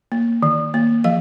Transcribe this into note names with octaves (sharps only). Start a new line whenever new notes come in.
A#3
D#3
A#3
F3 F5